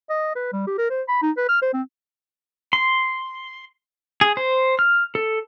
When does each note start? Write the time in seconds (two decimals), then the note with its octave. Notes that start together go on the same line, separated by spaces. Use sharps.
0.10 D#5
0.36 B4
0.53 G3
0.67 G4
0.78 A#4
0.90 C5
1.08 B5
1.22 D#4
1.37 B4
1.49 F6
1.62 C5
1.74 C4
2.73 C6
4.21 G#4
4.37 C5
4.79 F6
5.15 A4